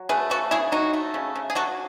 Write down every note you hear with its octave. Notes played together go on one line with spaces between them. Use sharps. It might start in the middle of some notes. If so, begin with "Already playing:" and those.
Already playing: F#3
A3 G#4 B4
C#3 F#4 A4
C#3 E4 G#4
F#3 D#4 F#4
A3
C#3
C#3
G#4
F#3 F#4 A4